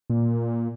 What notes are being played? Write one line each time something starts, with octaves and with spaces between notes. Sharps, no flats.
A#2